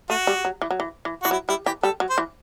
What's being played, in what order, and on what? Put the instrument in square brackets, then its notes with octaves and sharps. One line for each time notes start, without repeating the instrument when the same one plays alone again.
[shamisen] A3 [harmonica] F#4
[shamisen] G3
F#3
E3
F#3
E3
E3
[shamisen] E3 [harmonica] F#4
[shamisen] F#3 [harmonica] E4
[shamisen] G3 [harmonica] E4
[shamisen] E3 [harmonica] G4
[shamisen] G3 [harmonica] A4
[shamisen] F#3
[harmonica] C5
[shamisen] E3